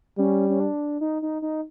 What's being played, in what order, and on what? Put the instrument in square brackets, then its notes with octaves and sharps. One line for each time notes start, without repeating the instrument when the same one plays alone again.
[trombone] G3 [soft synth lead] C#4
[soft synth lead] C#4
D4
D#4
D#4
D#4